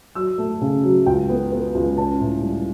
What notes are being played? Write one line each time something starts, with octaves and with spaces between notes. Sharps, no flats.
F#3 E6
A3
C#3
F#3
C#2 G5
B3
B3
C#2
C#4 A5
A2
G3